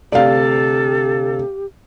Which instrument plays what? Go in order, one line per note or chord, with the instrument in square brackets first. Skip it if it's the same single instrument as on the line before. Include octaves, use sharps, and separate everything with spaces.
[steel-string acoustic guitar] D2 C3 [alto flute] G4 [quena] A4 [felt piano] D5 F5